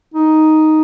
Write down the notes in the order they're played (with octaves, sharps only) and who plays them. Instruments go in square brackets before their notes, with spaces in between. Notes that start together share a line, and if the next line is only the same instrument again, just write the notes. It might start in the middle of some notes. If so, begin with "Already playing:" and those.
[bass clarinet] D#4